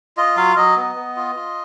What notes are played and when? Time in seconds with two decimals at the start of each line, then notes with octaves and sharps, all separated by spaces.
0.17 F4 D#5
0.36 F#3 F5
0.56 F#3 D#5
0.76 B3
0.96 B3
1.16 F4
1.36 F4